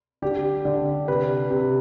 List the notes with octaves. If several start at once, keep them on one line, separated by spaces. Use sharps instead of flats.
D3 G4
D3
C3 B4
C3